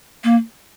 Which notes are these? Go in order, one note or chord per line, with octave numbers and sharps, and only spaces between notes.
A#3